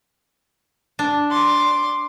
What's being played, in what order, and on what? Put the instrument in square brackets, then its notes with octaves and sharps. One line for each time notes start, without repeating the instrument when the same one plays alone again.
[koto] D4
[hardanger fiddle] C6 D6